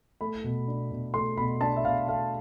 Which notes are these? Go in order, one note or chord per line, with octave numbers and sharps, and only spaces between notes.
A3 B5
B2
D4
B2
A3 C6
B2 B5
D4 A5
E5
B2 F5
A3 F5